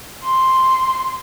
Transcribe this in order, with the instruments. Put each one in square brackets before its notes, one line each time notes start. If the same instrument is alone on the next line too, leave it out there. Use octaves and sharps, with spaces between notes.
[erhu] C6